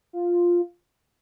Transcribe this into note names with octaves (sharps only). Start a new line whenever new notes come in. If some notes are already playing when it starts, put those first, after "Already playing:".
F4